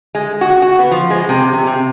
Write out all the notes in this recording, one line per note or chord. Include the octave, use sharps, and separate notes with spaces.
G#3
F#4
F#4
B3
F3
G#3
C3
C3
C3